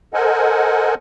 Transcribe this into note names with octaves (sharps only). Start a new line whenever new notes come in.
A4 A#4 C5 D#5 F#5 G#5